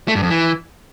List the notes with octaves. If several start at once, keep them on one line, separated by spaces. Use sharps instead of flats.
A3
G2
F2
E3